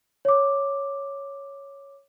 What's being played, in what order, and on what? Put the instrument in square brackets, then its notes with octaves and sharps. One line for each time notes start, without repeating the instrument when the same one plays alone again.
[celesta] C#5 D6